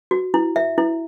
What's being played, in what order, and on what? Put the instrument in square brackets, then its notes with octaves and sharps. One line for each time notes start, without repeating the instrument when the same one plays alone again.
[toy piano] F#4
E4
E5
E4